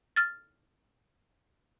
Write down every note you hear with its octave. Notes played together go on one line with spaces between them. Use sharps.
F6 A6